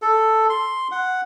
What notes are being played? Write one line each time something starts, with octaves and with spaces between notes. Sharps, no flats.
A4
C6
F#5